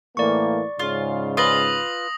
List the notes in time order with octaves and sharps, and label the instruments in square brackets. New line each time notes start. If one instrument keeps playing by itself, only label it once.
[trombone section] A2 E3 A#3 [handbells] D5 C#6
[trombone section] G#2 C#3 [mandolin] F4
[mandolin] F4 B4 [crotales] D#6 A#6 F#7